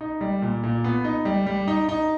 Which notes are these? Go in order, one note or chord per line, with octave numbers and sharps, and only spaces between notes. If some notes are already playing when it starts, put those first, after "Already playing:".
D#4
G3
A#2
A#2
B3
D#4
G3
G3
D#4
D#4